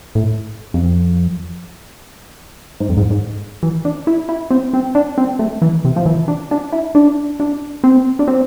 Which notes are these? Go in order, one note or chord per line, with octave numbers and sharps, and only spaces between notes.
A2
F2
G#2
F2
G#2
G#2
E3
D4
E4
E4
C4
C4
D4
C4
A3
E3
C3
F3
E3
D4
D4
E4
D4
D4
C4
D4
C4